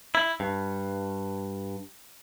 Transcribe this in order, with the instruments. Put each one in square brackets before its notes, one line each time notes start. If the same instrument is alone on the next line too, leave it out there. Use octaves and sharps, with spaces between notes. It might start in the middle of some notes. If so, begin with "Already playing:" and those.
[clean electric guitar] E4
G2